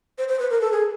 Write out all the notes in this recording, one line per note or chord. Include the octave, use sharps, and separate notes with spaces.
C5
C5
B4
A#4
A4
G#4